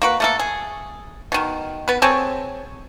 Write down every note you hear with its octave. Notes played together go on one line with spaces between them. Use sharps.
A#3 F#4 B4
A3 A#3 A4
G#4
B2 D#3
B3 B4
C4 G#4 A4 C#5